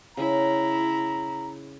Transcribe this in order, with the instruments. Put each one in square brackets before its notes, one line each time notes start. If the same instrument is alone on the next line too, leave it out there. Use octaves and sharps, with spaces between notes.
[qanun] C#3 [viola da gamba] E4 [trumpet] A#5